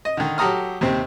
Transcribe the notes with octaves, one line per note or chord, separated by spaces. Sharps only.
D#5
D3 D#3
F#3 G4 A4 A#5 D#6 F6
D#2 C3 C4